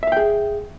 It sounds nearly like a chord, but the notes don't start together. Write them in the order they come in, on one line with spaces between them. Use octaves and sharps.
E5 F5 G5 G#4